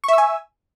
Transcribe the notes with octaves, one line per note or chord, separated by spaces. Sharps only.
E5 G#5 C#6 E6